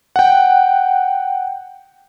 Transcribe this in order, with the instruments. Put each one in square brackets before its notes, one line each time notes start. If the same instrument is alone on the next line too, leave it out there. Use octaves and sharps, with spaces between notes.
[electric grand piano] F#5 G5